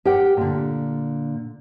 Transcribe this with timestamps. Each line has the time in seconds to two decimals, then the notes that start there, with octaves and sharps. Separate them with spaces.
0.05 G4 A#4 F#5 G5
0.37 A#2 D3